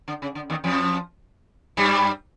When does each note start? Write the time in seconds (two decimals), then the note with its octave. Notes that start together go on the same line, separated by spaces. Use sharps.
0.08 D3
0.22 C#3
0.35 D3
0.50 D#2 D#3
0.64 F2 F3
1.77 G2 G3